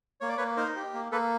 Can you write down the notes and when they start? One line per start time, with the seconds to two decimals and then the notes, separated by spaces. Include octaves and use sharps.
0.21 A#3 C#5
0.29 D5
0.37 A#3 B4 C#5
0.57 D#4 A#4 C5
0.76 G4
0.94 A#3
1.12 A#3 A4 B4